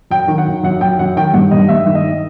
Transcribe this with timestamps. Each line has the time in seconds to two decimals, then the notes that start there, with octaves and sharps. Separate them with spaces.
0.11 F#2 G5
0.28 D#3
0.38 F#5
0.46 F#2
0.63 F#2 F#5
0.81 F#2 G5
0.99 F#2 F#5
1.17 D#3 G5
1.34 G2 F#5
1.51 G2 D#5
1.69 G2 E5
1.86 D#3
1.95 D#5